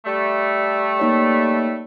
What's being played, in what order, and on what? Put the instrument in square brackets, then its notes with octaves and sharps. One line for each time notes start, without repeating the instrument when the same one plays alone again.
[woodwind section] G3 A3
[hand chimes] A#3 D#4 C#5